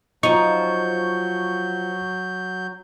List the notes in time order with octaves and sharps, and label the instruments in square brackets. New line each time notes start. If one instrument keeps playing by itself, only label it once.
[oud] F3 D#4 [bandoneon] F#3 G6 [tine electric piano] C#6